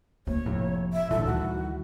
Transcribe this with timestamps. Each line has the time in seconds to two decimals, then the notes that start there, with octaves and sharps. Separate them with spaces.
0.27 D2 A#3 C#5
0.46 F1 F2 A2 C3
0.93 E5
1.11 A#2 D3 E3 G3 A4
1.25 D2 D#3 E3 F#4